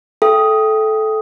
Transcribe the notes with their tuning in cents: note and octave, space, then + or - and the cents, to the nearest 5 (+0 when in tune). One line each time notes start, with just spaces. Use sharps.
A4 -15 E5 +40 G5 +0